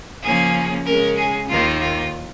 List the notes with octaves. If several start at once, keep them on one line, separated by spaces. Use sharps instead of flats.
C#3 F3 A#3 C#4 G#4
C#3 G#3 C#4 A#4
G#4
D#2 D#3 A#3 F4
F4